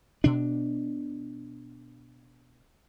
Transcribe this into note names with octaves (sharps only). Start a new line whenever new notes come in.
B2 D4